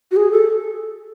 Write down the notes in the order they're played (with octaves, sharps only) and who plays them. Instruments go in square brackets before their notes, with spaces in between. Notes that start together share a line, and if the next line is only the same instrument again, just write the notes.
[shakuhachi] F#4
G#4
A4